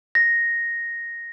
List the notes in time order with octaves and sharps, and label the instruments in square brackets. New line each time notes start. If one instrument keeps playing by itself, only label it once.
[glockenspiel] A#6